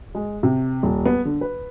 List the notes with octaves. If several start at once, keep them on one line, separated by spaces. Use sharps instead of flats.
G#3
C3
D#1
B3
D3
B4